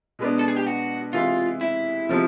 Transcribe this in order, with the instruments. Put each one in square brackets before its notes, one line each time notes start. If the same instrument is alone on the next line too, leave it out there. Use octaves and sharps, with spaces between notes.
[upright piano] B2 G#3 B3 D4
[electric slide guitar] A4
G#4
G4
F#4
[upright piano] C3 E3 G#3 [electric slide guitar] F4
[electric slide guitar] E4
[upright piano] C3 F3 G#3